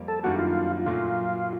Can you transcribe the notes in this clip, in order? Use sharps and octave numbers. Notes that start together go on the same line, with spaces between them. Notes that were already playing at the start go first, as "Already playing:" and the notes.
Already playing: F2 G3 A#3
A4
F#2 D#3 G3 A#3 D4 F#4
F4
A#2 F#3 A3 F4